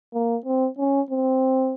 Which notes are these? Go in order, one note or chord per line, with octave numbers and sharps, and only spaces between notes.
A#3
C4
C#4
C4